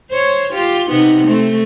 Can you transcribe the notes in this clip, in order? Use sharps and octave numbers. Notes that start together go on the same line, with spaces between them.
C5 C#5
F4 G4
C3 B3 D#4
A3 C4